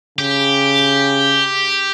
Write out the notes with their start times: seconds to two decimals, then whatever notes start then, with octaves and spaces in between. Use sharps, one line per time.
0.19 C#3 G4